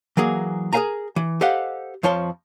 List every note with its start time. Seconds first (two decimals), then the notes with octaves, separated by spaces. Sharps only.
0.17 E3 F#3 A#3 G#4
0.73 G#4 A#4 B4 F5 G#5 A#5
1.16 E3
1.41 G4 A4 C5 D#5 F5 F#5
2.03 F2 F3 C#5 A5 C6